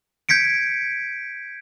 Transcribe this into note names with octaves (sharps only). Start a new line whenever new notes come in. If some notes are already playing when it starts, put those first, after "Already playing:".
G6 G#6 B6 C#7 D7